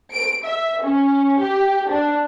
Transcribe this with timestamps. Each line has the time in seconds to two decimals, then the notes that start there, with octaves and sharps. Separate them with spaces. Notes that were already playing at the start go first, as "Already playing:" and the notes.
0.12 D7
0.45 E5
0.83 C#4
1.40 G4
1.90 D4